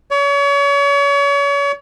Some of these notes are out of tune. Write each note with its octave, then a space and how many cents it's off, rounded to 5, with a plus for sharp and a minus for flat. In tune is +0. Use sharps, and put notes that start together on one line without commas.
C#5 +35